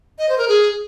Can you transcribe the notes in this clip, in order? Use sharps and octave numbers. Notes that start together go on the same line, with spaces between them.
D#5
C5
A#4
G#4